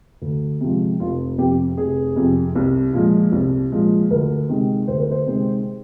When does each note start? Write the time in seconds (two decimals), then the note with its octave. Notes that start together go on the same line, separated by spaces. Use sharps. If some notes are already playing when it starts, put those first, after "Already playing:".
0.22 D2
0.61 C3 F3 G#3
1.00 F1 F4
1.38 F2 C3 G4
1.77 F1 G#4
2.16 F2 C3
2.56 C2
2.93 A#2 F3 G#3
3.32 C2
3.72 A#2 F3 G#3
4.10 D2 A#4
4.49 C3 D#3 G#3
4.88 D2 C5
5.00 A#4
5.11 C5
5.27 C3 D#3 G#3